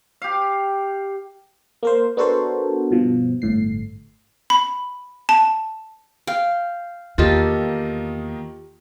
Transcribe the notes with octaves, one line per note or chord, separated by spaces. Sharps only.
G4 F5
A#3 A#4 C5
B3 D4 F#4 A4 A#4 C5
G2 B2 F3
G1 A2 C7
B5
A5
F5 G5
E2 D#3 A#3 F4 G4 A4 D#5